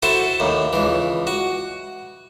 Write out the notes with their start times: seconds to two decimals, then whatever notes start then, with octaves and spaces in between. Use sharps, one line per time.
0.03 E4 F#4 A4 C5
0.40 D#2 A2
0.73 C#2 E3
1.27 F#4